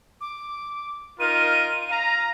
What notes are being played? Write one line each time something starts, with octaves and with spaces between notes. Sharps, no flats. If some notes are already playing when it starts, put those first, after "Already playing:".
D6
D#4 F4 A#4 D#7
F5 A#5